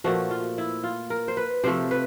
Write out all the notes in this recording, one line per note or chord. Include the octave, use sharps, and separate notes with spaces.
A#2 F3 A3 F#4
F4
E4
F4
A#4
C5
B4
C3 F3 A3 C5
B4